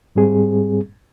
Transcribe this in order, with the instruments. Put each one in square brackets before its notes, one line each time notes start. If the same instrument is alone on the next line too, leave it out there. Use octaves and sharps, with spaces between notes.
[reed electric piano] G#2 G3 C4 G#4